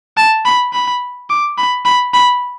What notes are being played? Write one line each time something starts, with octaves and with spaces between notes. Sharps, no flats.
A5
B5
B5
D6
B5
B5
B5